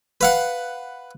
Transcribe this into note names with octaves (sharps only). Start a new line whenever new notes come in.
B4 F5 F#5